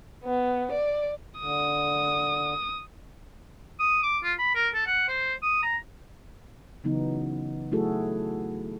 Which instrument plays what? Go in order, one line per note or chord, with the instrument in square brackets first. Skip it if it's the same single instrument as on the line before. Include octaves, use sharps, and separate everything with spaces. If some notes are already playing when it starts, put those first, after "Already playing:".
[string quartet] B3
D5
[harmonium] D3 [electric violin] D#6
[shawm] D#6
D6
F4
B5
A#4
A4
F#5
C5
D#6
A#5
[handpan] C#3 E3 F#3 B3 D#4
F#3 A3 E4 F#4 G#4 A4